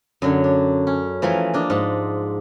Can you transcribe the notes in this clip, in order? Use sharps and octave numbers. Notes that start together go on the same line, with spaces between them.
F#2 D3 C#5
D4
C#4
E3 F3 A3 A#4 G#5 B5
A#3 D4 D#5
G#2 A5